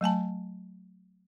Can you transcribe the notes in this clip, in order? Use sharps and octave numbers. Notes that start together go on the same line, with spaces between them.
F#3 A3 G#5 A5